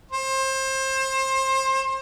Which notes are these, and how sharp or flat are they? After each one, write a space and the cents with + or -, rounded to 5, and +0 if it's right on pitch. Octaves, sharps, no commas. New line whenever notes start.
C5 +25